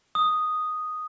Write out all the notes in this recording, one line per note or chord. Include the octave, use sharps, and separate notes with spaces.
D#6